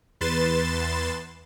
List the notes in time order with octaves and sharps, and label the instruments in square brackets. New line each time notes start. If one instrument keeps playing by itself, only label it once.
[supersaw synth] E2 B4 C6 A6 E7